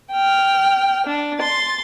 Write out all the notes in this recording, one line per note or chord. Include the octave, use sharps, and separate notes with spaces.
G5 F6
D4
C6 A6